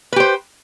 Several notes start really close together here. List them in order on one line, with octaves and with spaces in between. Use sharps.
B4 G4 C5